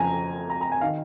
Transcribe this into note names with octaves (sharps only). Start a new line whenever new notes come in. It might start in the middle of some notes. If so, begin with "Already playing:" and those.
Already playing: F2 C#3 F3 G#5 A#5
A#5
A#5
G#5
D#3 F5